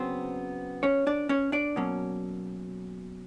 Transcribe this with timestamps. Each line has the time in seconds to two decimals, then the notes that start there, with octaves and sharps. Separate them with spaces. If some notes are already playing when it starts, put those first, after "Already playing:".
Already playing: C#3 F#3 B3 C4 C5
0.83 C#4 C#5
1.07 D4 D5
1.29 C#4 C#5
1.52 D4 D5
1.76 B2 F#3 A#3 C#4